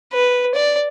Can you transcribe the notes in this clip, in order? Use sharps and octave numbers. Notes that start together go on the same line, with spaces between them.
B4
D5